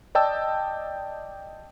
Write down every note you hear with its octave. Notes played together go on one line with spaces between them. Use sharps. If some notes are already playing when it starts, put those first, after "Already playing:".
D5 D#5 G5 A5 E6